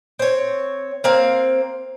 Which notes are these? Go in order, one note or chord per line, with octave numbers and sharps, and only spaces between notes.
C4 C#5
A#3 C4 F5